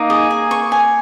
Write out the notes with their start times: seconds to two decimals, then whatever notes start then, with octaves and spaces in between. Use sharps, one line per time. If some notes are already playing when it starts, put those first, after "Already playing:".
Already playing: A#3 D#4
0.10 G#4
0.31 G#5
0.51 C#6
0.72 G#5